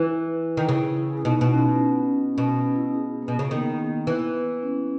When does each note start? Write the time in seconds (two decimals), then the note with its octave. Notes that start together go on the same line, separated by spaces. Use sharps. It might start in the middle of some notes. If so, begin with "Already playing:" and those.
Already playing: E3 B4
0.57 D#3
0.69 C#3 E4
0.97 E4
1.25 B2 D#4
1.41 B2
1.53 C#4
2.38 B2 C#4
2.57 C#4
2.76 E4
2.94 G#4
3.22 A#3
3.28 B2
3.39 C#3
3.44 A#3
3.50 D#3 B3
4.07 E3
4.63 C#4